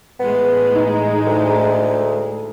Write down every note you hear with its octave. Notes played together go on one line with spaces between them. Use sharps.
A1 A2 G#3 B3
D#4
D2